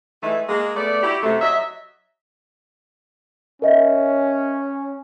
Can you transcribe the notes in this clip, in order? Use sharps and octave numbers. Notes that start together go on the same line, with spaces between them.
E3 G#3 A3 D#4 G#4
G#3 A#3
A3 B3 D5
E4 F#4 G4
F#2 C3 A3
F#3 D#5 E5
C#4 A#4 D#5 E5